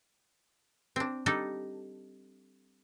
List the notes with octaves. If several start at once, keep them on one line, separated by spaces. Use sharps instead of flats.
C4 D4
G3 D4 D#4 A4